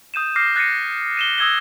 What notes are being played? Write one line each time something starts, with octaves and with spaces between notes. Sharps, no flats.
D#6 G6 D#7 E7
D6 F6 G6 A#6 C7
F#6 A6 A#6 C7 C#7 D#7
D#7 E7 G7
D#6 E6 G#6 A#6 G7